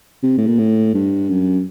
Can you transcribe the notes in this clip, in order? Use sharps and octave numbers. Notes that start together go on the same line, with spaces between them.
C3
A2
A#2
A2
G2
F#2